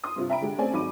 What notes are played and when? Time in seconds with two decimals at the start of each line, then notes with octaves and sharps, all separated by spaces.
0.04 C6 D#6
0.16 G2 C3 F4
0.30 E5 G5 A#5 B5 D7
0.41 D3 G#3 G4
0.58 A3 C4 C#4 G#4 D5 G#5
0.73 G#1 F#3 D#4 B5 D6 D#7